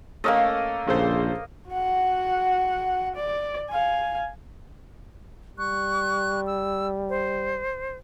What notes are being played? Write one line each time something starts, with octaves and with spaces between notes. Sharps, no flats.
A3 A#3 C#4 A4 A#4 D#5
A#1 C#3 A4 C5
F#4 F#5
D5
F5 G#5
G3 C#6 F#6
E6
C5